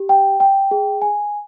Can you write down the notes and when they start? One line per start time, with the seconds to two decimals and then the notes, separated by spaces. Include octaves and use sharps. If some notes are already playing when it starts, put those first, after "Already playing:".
Already playing: G4
0.09 G5
0.40 G5
0.71 G#4
1.02 G#5